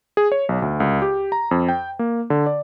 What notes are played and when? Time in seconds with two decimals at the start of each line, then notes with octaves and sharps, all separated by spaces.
0.17 G#4
0.32 C#5
0.49 B1
0.62 D2
0.80 C#2
1.02 G4
1.32 A#5
1.51 F2
1.68 G5
1.99 A#3
2.30 D3
2.46 D5